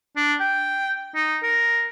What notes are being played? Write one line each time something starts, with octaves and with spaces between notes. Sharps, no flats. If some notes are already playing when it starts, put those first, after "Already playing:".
D4
G5
D#4
A#4